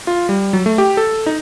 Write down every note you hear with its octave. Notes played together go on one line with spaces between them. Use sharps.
F4
G3
F#3
A3
G4
A4
D#4